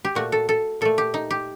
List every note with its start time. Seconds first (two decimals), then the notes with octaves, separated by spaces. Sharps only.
0.05 G4
0.15 A#2 A3 F#4
0.32 A4
0.49 A4
0.81 A#2 A3 A4
0.98 G4
1.14 D#4
1.31 G4